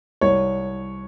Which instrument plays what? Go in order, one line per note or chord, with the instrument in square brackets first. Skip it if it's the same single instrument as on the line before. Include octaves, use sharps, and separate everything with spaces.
[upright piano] C2 C#5